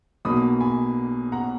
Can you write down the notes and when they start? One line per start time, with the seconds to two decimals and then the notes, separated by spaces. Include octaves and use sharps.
0.25 B1 B2 F#3 A#3 B5 D#6
0.60 G#5 B5
1.32 F#5 A#5